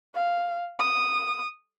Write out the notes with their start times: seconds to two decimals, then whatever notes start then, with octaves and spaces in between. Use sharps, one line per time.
0.15 F5
0.79 D#6